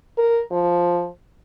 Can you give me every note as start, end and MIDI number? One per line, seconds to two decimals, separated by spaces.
0.18 0.42 70
0.52 1.07 53